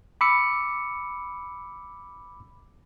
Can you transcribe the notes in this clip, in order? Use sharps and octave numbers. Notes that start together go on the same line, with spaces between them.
B5 D6 E6 C#7